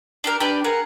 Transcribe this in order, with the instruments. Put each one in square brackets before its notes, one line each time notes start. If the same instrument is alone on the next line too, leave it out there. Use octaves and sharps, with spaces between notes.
[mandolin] D4 G4 A#4
[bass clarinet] D4 [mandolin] G4 B4 D5
[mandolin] G#4 F#5 [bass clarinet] A#4